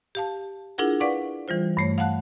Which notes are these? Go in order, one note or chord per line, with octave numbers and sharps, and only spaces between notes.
G4 F5 A5
D4 E4 F4 G#4 A#4 F#5
B4 D5 F5 F#5 C#6 D6
E3 G3 F4 C5
G2 A3 C#5
F5 F#5 A5 F#6